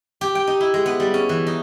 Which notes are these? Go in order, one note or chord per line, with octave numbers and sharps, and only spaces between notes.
G4
G5
D#4
E4
G#3
B3
G3
C#4
E3
D#4